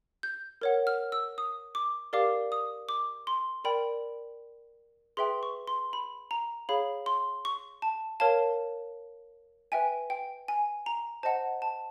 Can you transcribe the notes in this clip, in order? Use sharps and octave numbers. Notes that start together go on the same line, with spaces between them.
G6
A#4 C#5 F#5
F6
E6
D#6
D6
G4 A#4 D5 F5 D6
D#6
D6
C6
A#4 D5 G5 B5
G#4 B4 E5 G5 C6
C#6
C6
B5
A#5
G#4 C#5 F5 B5
C6
C#6
A5
A#4 C#5 F5 A5
B4 E5 G5 G#5
G5
G#5
A#5
C5 D#5 F#5 A5
A5